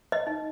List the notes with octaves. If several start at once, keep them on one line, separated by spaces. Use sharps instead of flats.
D#5
D#4